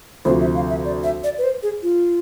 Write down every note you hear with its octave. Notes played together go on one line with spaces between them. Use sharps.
D2 C3 F3 C5
E5
F5
E5
D5
E5
D5
B4
C5
G#4
F4